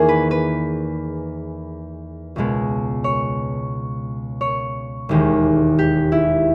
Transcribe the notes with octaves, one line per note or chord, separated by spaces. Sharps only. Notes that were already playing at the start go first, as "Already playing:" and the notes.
Already playing: E2 D#3 A#3 G#4
B4
B4
C#2 B2 G#3
C#5
C#5
E1 D#2 D#3 G#3
G4
E4